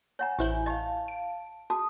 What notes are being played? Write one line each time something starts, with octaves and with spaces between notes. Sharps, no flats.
C#5 F#5 G#5 A#5
A1 E4 G4 C5 G6
G4 D#5 F5 A5
D7
F#4 G#4 A5 D#6